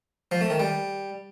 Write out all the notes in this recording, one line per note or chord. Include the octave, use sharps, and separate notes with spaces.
F3
A3
D#3
G3